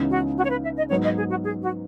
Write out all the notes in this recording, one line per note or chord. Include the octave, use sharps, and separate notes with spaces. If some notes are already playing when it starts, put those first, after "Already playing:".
Already playing: C#2 C#3 E3 B3 D#4
F#4
F#4
C#5
B4
E5
D#5
G#2 F#3 B3 D#4 C#5
D#5
G#4
F#4
G#4
F#4